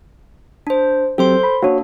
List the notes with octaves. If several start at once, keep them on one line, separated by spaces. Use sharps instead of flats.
D4 C5
F#3 C4 G4 A4 C5 C6
B5
A#3 D4 F#4 C#5